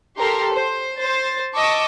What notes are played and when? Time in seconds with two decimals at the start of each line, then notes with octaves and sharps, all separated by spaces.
0.19 G4 A4 A#4 C6
0.55 C5
0.99 C5 A6
1.56 D#5 A5 C#6 D6 E6